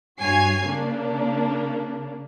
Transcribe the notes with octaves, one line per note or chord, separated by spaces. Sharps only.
G2 F#4 C#5 G#5 G#6 C7
C#3 A#3 D4